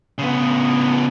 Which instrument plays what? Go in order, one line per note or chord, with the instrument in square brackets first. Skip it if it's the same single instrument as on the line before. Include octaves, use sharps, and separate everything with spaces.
[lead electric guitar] C#3 B3